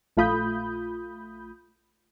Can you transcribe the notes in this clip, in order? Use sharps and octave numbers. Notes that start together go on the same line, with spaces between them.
A#1 A3 F4 B5 D#6 G6